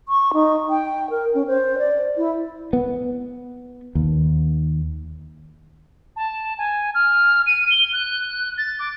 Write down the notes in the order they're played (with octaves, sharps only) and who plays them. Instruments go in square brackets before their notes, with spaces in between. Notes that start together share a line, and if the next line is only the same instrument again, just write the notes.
[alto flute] C#6
D#4
G5
A#4
C#4
C5
D5
E4
[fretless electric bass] B3
D#2
[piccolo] A5
G#5
F6
D#7
G7
F#6
A6
D6